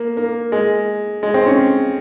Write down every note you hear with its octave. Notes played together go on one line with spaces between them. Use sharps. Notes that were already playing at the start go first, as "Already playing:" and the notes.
Already playing: A#3
A#3
G#3
G#3
C4
C#4